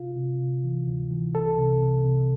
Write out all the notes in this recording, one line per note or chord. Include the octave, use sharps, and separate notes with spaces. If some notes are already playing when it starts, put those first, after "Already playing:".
Already playing: C3 F4
C3
C3
E3
D2
E3
C2 A4
C3
C3
C3